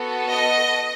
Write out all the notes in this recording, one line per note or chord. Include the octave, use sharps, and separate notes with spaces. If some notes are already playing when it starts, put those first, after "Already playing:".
Already playing: B3 F#4 A4
D#5